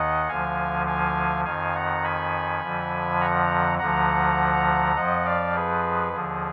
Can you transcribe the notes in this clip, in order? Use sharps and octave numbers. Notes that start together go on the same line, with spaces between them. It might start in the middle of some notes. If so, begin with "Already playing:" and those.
Already playing: D#2 D#3 D#5 F#5
D2 D3 F3 F5 G#5
F5 G#5
F2 D#3 F5 G#5
F#5 A#5
G#5 B5
F2 D3 F3
F#5 A#5
D2 D3 F3 F#5 A#5
F2 F3 D#5 F#5
D5 F5
G#4 B4
D#2 D3 F3 G#4